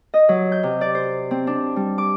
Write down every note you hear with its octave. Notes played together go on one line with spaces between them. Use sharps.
D#5
F#3
G6
C3
D5
C5
C4
D4
G3
D6